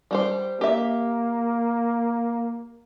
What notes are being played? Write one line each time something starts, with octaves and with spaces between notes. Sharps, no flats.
G3 G4 C5
A#3 G4 E5